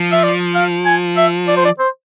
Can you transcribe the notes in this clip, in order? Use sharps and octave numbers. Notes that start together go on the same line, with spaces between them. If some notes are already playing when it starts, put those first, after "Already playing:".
Already playing: F3
E5
D5
F5
G#5
E5
D5
C5
D5
C5